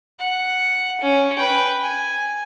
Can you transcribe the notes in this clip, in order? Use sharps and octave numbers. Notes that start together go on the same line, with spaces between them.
F#5
C#4
B4 G5
G#5